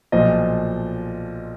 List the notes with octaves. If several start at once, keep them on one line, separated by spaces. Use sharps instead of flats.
B1 A#2 F3 D#5